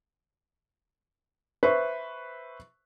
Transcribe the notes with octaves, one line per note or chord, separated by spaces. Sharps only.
B4 C5 E5 C#6